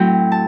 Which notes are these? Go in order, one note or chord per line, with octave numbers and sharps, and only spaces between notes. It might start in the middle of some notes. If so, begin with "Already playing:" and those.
Already playing: A2 F#3 C4 E4 G5
A5